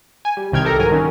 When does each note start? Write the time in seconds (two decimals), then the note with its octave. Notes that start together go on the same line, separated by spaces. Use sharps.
0.25 G#5
0.37 G3
0.52 C2 C3 D#3 G5 F6 G#6
0.64 G4 A4 A#4 A#5
0.79 G#2 F#3 A#4 G#5
0.91 D#3 F#3 C#4